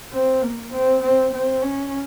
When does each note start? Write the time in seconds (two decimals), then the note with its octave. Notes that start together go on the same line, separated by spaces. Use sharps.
0.13 C4
0.42 A#3
0.72 C4
1.03 C4
1.33 C4
1.62 C#4